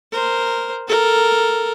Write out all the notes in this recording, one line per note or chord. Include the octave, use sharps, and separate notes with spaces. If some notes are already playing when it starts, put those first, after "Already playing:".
A#4 C5
A4 A#4